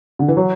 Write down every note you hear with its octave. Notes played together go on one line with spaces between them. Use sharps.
D3
E3
F#3